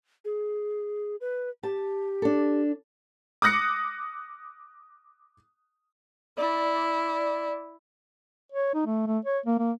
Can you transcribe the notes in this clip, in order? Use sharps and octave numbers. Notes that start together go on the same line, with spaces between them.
G#4
B4
G4 A5
D4 A4
D6 D#6 F#6 A#6 C#7
E4 D5
C#5
D#4
A3
A3
C#5
A#3
A#3